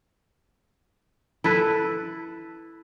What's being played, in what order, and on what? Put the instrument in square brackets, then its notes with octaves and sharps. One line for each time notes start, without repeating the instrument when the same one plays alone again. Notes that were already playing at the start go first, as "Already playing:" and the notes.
[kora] E4 A4 B4